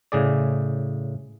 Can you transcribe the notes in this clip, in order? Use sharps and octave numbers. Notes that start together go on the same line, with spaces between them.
A2 C#3 G#4 D5